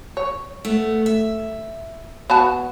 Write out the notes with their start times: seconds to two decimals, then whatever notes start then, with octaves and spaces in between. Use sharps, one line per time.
0.17 C#5
0.65 A3 B3
1.06 E5
2.30 B3 F#4 A5